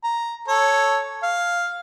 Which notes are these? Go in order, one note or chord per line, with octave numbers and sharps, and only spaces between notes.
A#5
A4 C#5
F5